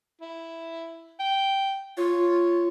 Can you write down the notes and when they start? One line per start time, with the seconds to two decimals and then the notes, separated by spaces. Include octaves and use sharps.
0.21 E4
1.20 G5
1.97 F4 C#5